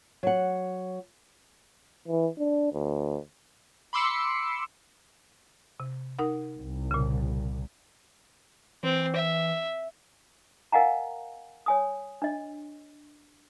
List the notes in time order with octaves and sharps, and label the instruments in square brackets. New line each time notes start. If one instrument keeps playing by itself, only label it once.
[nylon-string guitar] F#3 F#5
[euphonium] E3
D4
D2
[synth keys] B5 C6 D6 E6 C7 C#7
[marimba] C3
D#4 A#4 F#5
[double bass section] C2
[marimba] A#2 C#3
[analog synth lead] E3 [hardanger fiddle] C4
[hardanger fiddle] E5
[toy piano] A#4 D#5 F5 F#5 G#5 A#5
C#5 G#5 D#6
D4 D#5